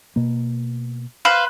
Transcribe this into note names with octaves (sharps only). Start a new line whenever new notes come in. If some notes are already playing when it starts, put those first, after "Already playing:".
B2 A#3
B4 C5 F5